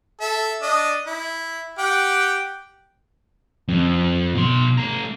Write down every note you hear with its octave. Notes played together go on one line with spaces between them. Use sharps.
A4 E5
D4 D#5
E4
G4 F#5 G5
F2
B2 C6
A3 A#5